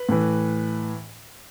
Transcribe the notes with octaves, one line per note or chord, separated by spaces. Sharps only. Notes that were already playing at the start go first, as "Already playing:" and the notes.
Already playing: B4
A2 E3